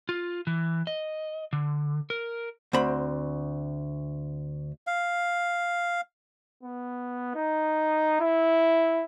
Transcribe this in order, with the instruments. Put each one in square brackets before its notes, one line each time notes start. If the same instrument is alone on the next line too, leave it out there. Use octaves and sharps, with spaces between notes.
[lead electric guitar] F4
E3
D#5
D3
A#4
[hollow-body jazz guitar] D2 C4 B5
[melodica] F5
[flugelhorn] B3
D#4
E4